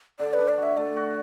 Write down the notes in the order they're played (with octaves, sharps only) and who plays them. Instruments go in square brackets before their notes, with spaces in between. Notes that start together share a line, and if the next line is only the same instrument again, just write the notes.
[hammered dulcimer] D3 [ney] D5
[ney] B4
[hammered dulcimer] D4
[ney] D5
[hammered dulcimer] F#4
[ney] E5
[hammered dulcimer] A3 [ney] D5
[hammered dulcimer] F#4